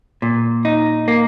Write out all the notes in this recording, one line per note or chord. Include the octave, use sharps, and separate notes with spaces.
A#2
D#4
A#3